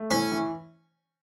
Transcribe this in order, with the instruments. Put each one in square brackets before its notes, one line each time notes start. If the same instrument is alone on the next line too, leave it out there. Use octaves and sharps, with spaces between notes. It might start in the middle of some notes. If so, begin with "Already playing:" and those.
Already playing: [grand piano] A3
[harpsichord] C#4 [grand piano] E4
[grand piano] E3